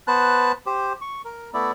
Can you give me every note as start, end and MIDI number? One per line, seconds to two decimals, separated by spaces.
0.07 0.52 59
0.07 0.52 71
0.07 0.52 72
0.07 0.52 81
0.07 0.52 90
0.66 0.93 67
0.66 0.93 72
1.01 1.22 85
1.25 1.50 70
1.54 1.72 57
1.54 1.72 59
1.54 1.72 64
1.54 1.72 74